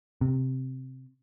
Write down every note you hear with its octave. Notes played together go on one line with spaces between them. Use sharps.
C3